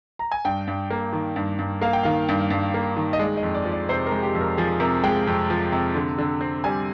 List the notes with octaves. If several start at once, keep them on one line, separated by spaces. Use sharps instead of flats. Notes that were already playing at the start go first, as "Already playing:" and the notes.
A#5
G#5
G2 G5
G2
A#3
D#3
G2
G2
A#3 F5
G5
D#3 F5
G2
G2
A#3
D#3
D#5
G#3 D5
D#5
F2
D5
F3
D5
C3 C5
A#4
G#3
G4
F2
A#4
F3 G#4
C3 A#4
G#3 G5
F2
F3
C3
D3
D3
C4
G3 G#5